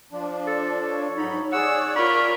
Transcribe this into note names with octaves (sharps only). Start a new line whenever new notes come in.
F3 D4
A4
C#5
G#2 F#3 D#4 B5
G#4 C#5 D5 F#5 E6
F4 A#4 B5 C#6